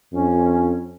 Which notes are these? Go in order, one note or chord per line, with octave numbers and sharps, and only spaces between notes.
F2 C#4